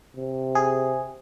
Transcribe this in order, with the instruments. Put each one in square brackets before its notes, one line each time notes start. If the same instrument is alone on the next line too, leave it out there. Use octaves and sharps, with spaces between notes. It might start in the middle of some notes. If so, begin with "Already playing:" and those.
[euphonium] C3
[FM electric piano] G#4